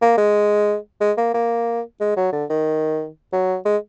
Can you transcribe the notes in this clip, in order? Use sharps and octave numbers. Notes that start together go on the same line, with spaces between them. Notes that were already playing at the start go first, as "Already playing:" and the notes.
A#3
G#3
G#3
A#3
A#3
G#3
F#3
D3
D#3
F#3
G#3